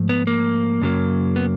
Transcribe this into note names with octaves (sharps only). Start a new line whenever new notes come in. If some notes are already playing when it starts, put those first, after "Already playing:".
Already playing: G#2 F3 A3
B3
A#3
F#2 C#3 F#3 A#3
B3